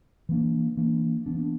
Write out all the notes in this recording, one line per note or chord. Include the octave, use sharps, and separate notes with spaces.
E3 A#3 D4
E3 A#3 D4
E3 B3 D4